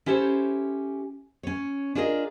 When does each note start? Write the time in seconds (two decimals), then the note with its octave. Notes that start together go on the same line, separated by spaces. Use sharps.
0.06 C#4 E4 G4 A4 C5
1.43 C#4 C#5
1.95 D4 F4 G#4 A#4 D#5